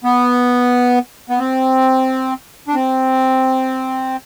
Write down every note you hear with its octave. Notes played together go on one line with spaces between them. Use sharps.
B3
B3
C4
D4
C4